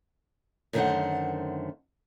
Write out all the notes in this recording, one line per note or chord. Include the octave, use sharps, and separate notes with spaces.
F#2 D3 D#3 A3 C5 F#5